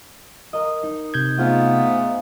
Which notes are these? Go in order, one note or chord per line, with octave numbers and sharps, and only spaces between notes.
A#4 D#5
D#4
C3 G6 G#6
G#2 A3 B3 F4